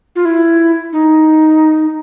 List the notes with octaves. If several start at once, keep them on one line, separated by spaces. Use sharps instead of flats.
F4
E4
D#4